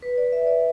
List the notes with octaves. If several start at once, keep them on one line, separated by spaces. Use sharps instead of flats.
B4
D5
E5
D5